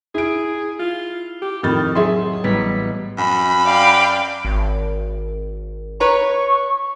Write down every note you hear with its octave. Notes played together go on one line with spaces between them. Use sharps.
E4 G#4 D7
F4
G4
F2 A2 D#3 A6
F#3 G#4 D#5 E5 C6
A1 G3 B3 B6
F#2 B5
D5 F5 G5
G#1
B4 C#5 A#5 C#6